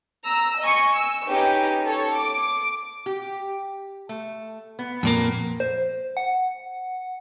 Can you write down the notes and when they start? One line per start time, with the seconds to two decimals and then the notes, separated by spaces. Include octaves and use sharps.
0.24 A#5 E6
0.60 D#5 G#5 C#6
0.96 E6
1.27 C#4 D#4 G4 B4
1.85 A4 C#5
2.15 D6
3.06 G4
4.09 A3
4.79 B3
5.03 F2 A#2 A#3
5.60 C5
6.17 F#5